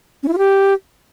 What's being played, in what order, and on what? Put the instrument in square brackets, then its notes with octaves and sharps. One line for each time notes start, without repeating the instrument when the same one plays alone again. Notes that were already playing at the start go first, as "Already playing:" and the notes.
[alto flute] C#4
E4
F4
G4